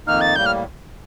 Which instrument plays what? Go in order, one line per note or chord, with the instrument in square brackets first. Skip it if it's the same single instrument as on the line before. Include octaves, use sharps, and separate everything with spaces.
[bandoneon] F2 D#3 A#3 D#4 [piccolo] F6
[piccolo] A6
[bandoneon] A2 G3 A#3 [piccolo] G6
[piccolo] F6